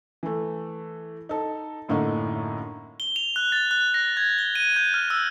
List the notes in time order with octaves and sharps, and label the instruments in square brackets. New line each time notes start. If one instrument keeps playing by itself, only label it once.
[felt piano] E3 A3
D#4 A4
F#2 A2 D3 A3 A#3 D#4
[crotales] G7
F7
F#6
A6
F#6
A#6
G#6
G7
D#7
G6
F6
E6